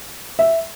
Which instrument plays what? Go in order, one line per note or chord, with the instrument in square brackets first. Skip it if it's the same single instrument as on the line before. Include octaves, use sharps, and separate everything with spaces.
[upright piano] E5